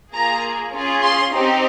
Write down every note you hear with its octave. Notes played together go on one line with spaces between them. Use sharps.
A#3 F4 G#4 A#5
C#4 F4 G#4
C6
C4 D#4 G4